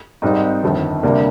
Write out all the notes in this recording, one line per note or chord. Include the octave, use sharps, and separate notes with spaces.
G#1 G#2 G3 C4 D#4
G1 F2 D#3
D2 C3 G3 A#3 D4